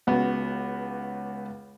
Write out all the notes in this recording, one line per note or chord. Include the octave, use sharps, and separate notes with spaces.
C#2 B3 F#4